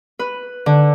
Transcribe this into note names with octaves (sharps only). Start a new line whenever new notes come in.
B4
D3